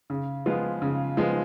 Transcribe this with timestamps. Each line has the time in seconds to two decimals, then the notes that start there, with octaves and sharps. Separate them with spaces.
0.10 C#3
0.46 F3 G#3 B3 F4
0.82 C#3
1.17 F3 G#3 B3 F4